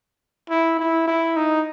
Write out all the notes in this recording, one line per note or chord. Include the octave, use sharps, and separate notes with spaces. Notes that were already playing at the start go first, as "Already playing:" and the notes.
E4
E4
E4
D#4